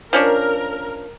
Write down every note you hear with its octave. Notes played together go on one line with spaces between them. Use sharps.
F3 C#4 D4 A#4